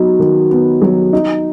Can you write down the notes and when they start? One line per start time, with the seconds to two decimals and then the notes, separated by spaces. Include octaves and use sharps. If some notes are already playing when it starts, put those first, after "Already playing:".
Already playing: F#3 B3 D#4
0.19 D#3
0.51 B3
0.82 F#3
1.13 D#4